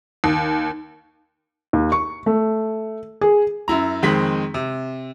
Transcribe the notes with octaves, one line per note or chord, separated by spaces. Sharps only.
D#2
D#2
C#6
A3
G#4
F#2 E4 A#5
F2 D#3 G#3 C4 B6 F#7
C3